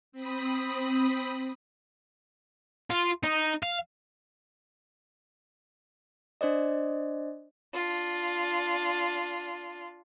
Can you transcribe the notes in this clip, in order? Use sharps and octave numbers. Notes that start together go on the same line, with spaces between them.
C4 B5 D#6
F4
D#4
F5
D4 C5 D5 D#5
D4 F4